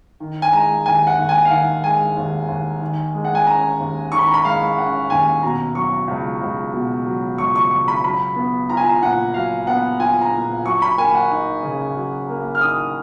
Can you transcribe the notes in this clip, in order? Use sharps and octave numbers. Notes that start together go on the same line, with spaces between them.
D#3
G#5
G#3 A#5
D#2 G#5
F#5
D#2
G#5
F5
D#3 F#5
G#3 G#5
D#2
D#2
D#3
G#3
F#5
G#5
C#4 A#5
D#2
D#3 C#6
B5
A#5
B5
G#3 F5
C#4 F#5
D#2 G#5
B2 A#5
F#3 C#6
C#2
C#2
B2
F#3
C#2 C#6
C#6
C#2 C#6
B5
F#3 B5
B3
F4 A#5
G#5
A#5
A#2 F#5
F#3 F5
B3 F#5
F4 G#5
A#5
A#2
F#3 C#6
B5
A#3 G#5
F#5
D#4
C#3
F#3
A#3
F6
D#4 D#6